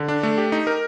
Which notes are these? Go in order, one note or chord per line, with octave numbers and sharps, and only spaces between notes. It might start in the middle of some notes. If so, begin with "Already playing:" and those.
Already playing: D3
D4
A3
G4
D#4
A#4